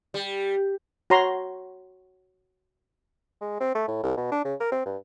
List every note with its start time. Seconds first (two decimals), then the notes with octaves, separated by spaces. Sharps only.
0.14 G3
1.10 F#4 C#5 A#5 C6
3.41 G#3
3.60 C4
3.75 A3
3.88 A2
4.03 C2
4.17 B2
4.31 D4
4.45 C#3
4.60 A#4
4.72 C4
4.86 G2